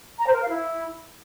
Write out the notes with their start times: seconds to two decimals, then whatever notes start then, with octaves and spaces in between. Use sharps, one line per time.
0.18 A#5
0.26 C5
0.33 A#4
0.41 F5
0.49 E4